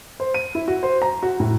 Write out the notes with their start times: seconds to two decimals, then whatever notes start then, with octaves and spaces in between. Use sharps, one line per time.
0.20 C5
0.34 D#7
0.55 E4
0.68 F#4
0.83 C5
1.02 A#5
1.23 F#4
1.40 A2